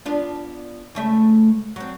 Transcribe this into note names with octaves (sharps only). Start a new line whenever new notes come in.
B3 D4 F4
C#3 A3 E5
F#3 C4